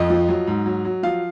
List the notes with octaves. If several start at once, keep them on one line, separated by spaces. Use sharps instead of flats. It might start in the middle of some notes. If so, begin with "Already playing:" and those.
Already playing: F2 D#5
F3
F#3
G#2
F#3
F#3
F3 F5